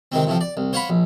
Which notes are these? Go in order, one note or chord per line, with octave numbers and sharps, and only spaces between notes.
C3 D#3 G#3 C4
A2 C3 F3
D5
C2
C5 C#5 F5 F#5 B5
A#1